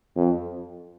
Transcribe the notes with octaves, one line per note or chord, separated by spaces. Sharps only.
F2